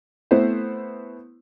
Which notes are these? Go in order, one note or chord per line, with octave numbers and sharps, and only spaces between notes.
A3 B3 C4 E4 B4 C5